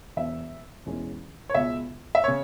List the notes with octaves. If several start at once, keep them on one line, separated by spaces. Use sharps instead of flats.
E1 E2 B2 B3 E5
E1 E2 E3 G#3 C#4
C#5
C#2 B2 G#3 E5
E5
C#3 C#5